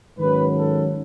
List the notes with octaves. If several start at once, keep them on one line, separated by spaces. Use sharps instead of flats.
G#2 D#3 F#3 C#4 B4
A4